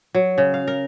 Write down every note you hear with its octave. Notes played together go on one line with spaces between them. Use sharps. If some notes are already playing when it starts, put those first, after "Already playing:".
F#3
C#3
F5
A#4